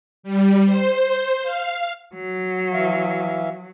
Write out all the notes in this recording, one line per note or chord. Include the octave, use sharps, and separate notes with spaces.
G3
C5
F5
F#3
E3 E5 F5